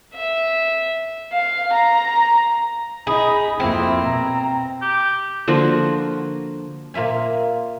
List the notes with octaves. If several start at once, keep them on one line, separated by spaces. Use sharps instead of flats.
E5
F5
A#5
D#4 G#4 B5
F2 A#3 C4 E4
B2 A#5
G4
D3 F3 A#3 F#4
A#2 F4 E5 G#5